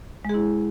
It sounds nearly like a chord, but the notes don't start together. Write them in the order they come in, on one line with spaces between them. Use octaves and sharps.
G#3 G#4 E4